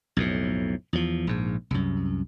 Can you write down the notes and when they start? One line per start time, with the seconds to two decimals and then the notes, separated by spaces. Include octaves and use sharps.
0.17 B1 F2 A2
0.93 E2 F3
1.27 A#1 G#2
1.71 C2 F#2